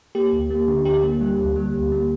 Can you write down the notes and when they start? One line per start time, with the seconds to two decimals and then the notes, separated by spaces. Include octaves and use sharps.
0.15 A#3 G4
0.32 D2
0.50 A#3
0.68 D3
0.85 D2 G4
1.03 A#3
1.21 G3
1.38 D2
1.56 G3
1.74 D2
1.92 A#3